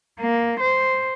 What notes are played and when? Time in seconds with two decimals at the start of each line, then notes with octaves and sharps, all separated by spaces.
0.20 A#3
0.60 C5